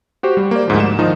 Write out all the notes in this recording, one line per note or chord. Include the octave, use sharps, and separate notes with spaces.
F#4 G4 C5
G3
A#3 D5
D2 G#2 F3
E7
D#3 F3 D#4